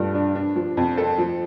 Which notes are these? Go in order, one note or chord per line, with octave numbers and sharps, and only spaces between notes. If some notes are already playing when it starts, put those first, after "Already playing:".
Already playing: G2 F3 A3
D4
D4
F3
F2
A4
F3